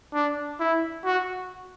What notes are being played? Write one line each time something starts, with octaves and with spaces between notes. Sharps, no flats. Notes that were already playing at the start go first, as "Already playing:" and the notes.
D4
E4
F#4